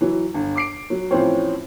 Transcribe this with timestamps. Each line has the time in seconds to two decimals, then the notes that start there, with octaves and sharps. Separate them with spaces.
0.01 E3 F#3
0.34 G1
0.55 D6 C7 D7
0.90 F#3
1.11 A2 E3 F3 C4 C#4